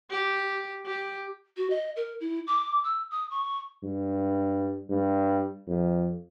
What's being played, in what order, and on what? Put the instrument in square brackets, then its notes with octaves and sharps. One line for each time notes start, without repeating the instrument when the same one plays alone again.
[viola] G4
G4
[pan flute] F#4
D#5
A#4
E4
D6
E6
D#6
C#6
[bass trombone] G2
G2
F2